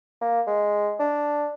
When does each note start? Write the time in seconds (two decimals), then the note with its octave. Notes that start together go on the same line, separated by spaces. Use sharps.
0.22 A#3
0.47 G#3
0.99 D4